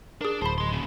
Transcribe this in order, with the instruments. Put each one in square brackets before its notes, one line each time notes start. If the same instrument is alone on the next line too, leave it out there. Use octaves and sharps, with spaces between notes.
[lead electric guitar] D4 [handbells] G#4 A#4
[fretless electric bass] D1 [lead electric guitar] C5 [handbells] A5 B5
[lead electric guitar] D#5 C6
A#2 C#3